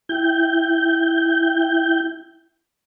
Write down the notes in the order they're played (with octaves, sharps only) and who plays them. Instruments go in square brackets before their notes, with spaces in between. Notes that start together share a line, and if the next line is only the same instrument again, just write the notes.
[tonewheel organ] E4 G5 G6